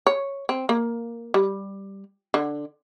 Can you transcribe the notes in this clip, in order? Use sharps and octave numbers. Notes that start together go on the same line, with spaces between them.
C#5
C4
A#3
G3
D3